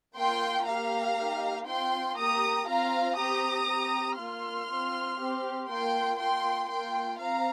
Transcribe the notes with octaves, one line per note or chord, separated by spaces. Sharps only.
A#3 F4 G5 C6
A#3 G4 F5 A#5
A#3 D#4 G4
C4 F4 G5 C6
A#3 G4 A#5 D#6
C4 F4 F5 A#5
C4 G4 A#5 D#6
C4 G4
A#3 F4 C6 F6
C4 F4
C4 G4
A#3 F4 G5 C6
A#3 F4 G5 C6
A#3 F4 G5 C6
C4 F5 A#5